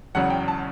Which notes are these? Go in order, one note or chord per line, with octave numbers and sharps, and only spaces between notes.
E1 E2 C#3 F#3 F#5
G5
A5